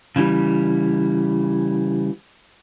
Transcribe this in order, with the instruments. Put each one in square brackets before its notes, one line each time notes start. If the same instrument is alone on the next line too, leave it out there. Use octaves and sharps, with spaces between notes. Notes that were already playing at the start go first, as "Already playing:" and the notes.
[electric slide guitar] C#3 E3 G3